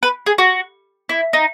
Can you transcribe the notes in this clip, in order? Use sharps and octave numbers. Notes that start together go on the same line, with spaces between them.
B4
G#4
F#4
E4
D#4